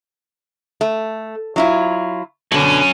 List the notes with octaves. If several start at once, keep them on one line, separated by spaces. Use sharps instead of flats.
A3
F#3 E4 F4
B2 D3 F#3 C#4